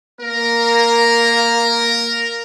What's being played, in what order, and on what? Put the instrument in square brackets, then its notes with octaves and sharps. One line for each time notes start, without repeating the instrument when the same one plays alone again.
[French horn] A#3 [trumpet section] A#4